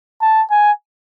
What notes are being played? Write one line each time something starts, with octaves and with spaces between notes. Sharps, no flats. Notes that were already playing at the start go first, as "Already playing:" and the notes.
A5
G#5